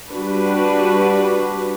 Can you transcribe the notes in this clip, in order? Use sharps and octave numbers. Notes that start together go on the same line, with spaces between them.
G3 D4 F#4 B4